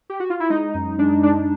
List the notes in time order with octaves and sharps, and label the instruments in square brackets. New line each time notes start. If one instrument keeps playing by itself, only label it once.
[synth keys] G4
F#4
F4
E4
G#3 D#4
F#2
G#3 D4
G#3 D4